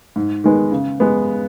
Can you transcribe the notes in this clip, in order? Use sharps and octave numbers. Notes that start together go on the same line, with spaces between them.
G#2
D#3 G#3 B3
C#3
G#3 B3